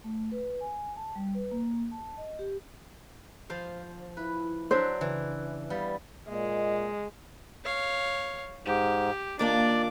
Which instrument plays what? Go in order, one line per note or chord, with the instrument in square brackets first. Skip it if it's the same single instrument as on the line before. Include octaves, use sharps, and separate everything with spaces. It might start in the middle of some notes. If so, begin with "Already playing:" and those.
[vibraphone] A3
B4
G#5
A5
G3
B4
A#3
A5
D#5
G4
[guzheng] F3 C5 F5
[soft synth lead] E4 [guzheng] B4
[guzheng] F#3 D4 E5 [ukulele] C5
[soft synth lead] C#3 [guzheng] E3
[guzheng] G3 B3 [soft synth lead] F5
[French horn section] A#2 D#5 [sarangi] G#3
[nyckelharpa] C#5 F5
[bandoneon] G#2 [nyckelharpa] G4
[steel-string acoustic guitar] D#2 A#3 F4 [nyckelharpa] D4 D6 [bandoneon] D5